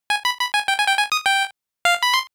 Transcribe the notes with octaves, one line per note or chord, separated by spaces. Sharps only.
G#5
B5
B5
G#5
G5
G#5
G5
G#5
D#6
G5
F5
B5
C6